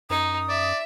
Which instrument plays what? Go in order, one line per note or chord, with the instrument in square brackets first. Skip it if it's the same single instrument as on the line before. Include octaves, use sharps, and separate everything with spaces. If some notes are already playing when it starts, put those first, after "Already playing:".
[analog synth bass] F#2 [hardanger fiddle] D#4 [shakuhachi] D#6
[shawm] D5 [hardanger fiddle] E5